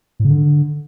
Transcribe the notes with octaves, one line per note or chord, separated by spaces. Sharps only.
A2
C#3
D3